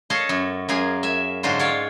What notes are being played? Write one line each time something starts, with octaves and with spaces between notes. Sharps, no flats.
A4 C#5 D#5 F5
F#2
F#2 A#3 G#4 G#5
E5 G#5
G#2 D3 F#3 G#3 F4
C#5 D5 F5